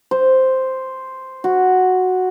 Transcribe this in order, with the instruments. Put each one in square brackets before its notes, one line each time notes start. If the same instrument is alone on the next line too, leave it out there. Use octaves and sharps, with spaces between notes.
[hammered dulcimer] C5
F#4